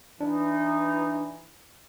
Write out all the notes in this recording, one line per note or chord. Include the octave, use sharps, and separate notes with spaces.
E3 D4 D#4